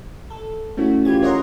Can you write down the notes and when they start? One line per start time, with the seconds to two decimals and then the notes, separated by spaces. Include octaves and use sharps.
0.30 A4
0.77 A3 C#4 E4 F#4
1.05 E3 F4 G4 G#6
1.22 A#4 C#5 D#5 F#5 A#5 C6